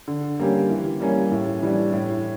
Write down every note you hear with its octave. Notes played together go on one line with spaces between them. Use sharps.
D3
G3 A#3 C#4 G4
E3
G3 A#3 C#4
A2
E3 G3 D4
A2